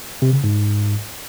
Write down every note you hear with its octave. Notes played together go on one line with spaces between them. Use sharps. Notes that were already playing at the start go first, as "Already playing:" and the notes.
C3
C#3
G#2